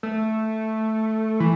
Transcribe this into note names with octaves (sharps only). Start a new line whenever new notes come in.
A3
E3